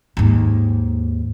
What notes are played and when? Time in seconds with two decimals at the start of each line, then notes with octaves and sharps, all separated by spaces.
0.17 D#2 G#2